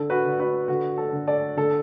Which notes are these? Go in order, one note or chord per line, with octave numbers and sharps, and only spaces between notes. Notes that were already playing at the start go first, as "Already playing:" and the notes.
Already playing: D3 A4
F#4 B4
D3
F#4 B4
D3 F#4
A4
D3
A4 D5
D3 A4